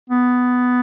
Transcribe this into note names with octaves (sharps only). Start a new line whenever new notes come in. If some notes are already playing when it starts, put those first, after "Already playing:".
B3